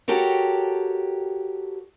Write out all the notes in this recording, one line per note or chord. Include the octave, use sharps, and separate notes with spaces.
F#4 G4 A4 A#4 C#5